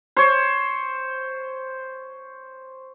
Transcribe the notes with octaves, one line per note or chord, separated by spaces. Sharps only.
C5 C#5